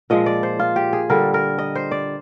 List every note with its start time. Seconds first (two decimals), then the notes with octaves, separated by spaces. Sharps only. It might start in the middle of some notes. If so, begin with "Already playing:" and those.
0.10 A#2 F3 G#3 D#5
0.26 D5
0.43 C5
0.59 F4
0.76 G4
0.93 G#4
1.10 D3 G3 A#4
1.34 A#4
1.58 D#5
1.75 C5
1.91 D5